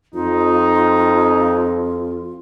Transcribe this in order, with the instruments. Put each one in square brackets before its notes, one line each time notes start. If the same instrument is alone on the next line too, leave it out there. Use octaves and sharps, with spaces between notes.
[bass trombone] F2 [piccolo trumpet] D#4 [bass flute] F4